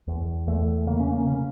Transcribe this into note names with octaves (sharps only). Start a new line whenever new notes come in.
E2
E2 A3
C#3 A#3
C#4
A#3
C#3 C#4